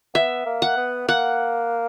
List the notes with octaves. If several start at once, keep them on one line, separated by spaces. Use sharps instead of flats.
B3 E5
A#3
F#5
B3
A#3 F#5